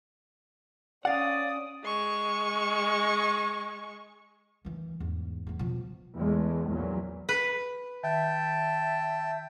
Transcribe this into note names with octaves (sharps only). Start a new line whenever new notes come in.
C#4 D5 F5 F#5 D#6
G#3 C#6
D#3 E3
E2 G#2
E2 B3
B2 F3
E2 G#3 A3
A#1 E2 A#2 F#3
B4
D#3 E5 G5 A5